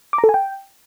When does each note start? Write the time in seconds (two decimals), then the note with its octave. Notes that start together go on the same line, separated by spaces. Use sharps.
0.13 D6
0.18 A#5
0.24 A4
0.29 G#5
0.34 G5